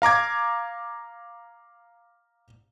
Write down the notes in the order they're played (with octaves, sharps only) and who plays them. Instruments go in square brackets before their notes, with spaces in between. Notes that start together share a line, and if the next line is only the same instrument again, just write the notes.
[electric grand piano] F5 A#5 D6 G#6